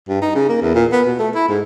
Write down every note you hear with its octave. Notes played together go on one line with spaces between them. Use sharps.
G2
D#4
C#3
A#3
E2
A#2
B3
B2
A3
E4
G#2